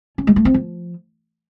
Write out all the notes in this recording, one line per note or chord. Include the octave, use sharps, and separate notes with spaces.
C#4
G#3
A3
C4
F3